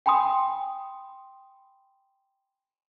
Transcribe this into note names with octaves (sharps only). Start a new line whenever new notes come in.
G5 G#5 B5 C6 D#6